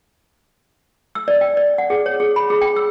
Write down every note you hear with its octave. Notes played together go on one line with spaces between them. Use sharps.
E6
D5
G5
D5
F#5
G#4
C#5
G#4
B5
G#4
G5
E6